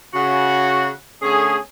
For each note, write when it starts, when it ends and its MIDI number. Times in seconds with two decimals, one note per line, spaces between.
0.14 0.90 49
0.14 0.90 66
1.22 1.57 50
1.22 1.57 57
1.22 1.57 61
1.22 1.57 68